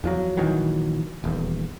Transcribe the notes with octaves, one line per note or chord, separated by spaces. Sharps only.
E2 F3 F#3
A#1 D#3 E3 F#3
D#1 E2